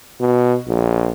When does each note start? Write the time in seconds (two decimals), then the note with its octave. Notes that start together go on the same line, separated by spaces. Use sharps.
0.20 B2
0.68 A#1